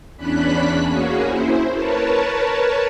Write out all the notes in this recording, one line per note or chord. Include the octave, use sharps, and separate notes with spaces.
E2 C#4 D4 B5 F#6 B6
A#3 C#4 F#4 G#4
E4 C5
A#4 B4 C#5 A5